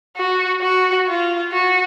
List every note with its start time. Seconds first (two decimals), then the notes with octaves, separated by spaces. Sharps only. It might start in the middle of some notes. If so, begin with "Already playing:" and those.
0.17 F#4
0.62 F#4
1.08 F4
1.52 F#4